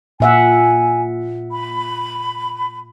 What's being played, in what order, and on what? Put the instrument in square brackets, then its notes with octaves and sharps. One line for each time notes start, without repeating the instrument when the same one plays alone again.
[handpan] A#2 E5 F#5 [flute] G#5
[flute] B5